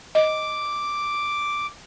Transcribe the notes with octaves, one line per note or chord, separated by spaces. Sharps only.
D#5 D6